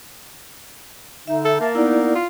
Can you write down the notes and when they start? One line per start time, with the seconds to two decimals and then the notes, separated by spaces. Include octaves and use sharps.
1.27 D3 D#4 E5
1.45 A4
1.61 A#3 A5
1.75 B3 D#4 E4 D5
2.15 F4